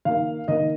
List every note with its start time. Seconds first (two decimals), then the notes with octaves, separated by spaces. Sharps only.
0.05 D#3 A#3 F5
0.48 D#3 A#3 D#5